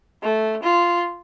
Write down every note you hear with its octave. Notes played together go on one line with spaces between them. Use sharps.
A3
F4